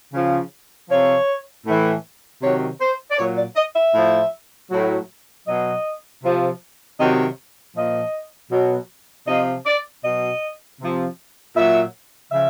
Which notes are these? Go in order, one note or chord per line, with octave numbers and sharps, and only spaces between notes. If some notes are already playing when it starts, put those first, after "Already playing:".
C#3 F3
C3 F3 C#5
A2 E3
C3 D#3 F#3 C#5
C5
D5
A#2 F#3 C#5
D5
D#5
E5
A2 F3
A2 F#3
B2 F#3 D#5
C3 F3
C3 D#3 F#3 D#5
A#2 F3 D#5
B2 F#3
C3 F3 D#5
D5
B2 F#3 D#5
C3 F3
A#2 F#3 E5
C#3 F3 E5